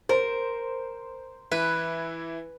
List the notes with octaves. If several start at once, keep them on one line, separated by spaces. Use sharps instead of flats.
A#4 C5
E3 E4 B4